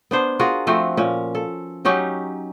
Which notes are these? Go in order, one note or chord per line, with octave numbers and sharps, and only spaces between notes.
B3 D4 C5
F4 F#4 G#4 A#4
F3 A3 C4 F#4
A#2 C#4
A4
F#3 C#4 D#4 G4